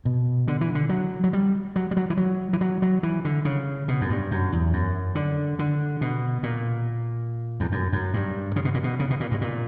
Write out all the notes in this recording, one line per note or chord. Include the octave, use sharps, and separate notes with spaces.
B2
D3
E3
D3
F#3
F#3
G3
F#3
G3
F#3
E3
F#3
E3
F#3
F#3
E3
D3
C#3
B2
F#2
G2
F#2
E2
F#2
D3
D3
B2
A#2
E2
F#2
F#2
G2
C#3
B2
A#2
B2
C#3
B2
A#2
G2
A#2